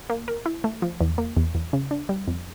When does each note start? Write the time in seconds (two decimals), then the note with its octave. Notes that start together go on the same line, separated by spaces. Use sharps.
0.10 A#3
0.28 A#4
0.46 E4
0.64 A3
0.82 F3
1.01 E2
1.18 A#3
1.37 E2
1.55 E2
1.73 C#3
1.91 D4
2.09 G3
2.27 F2